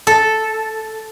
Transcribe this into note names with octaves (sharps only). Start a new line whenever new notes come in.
A4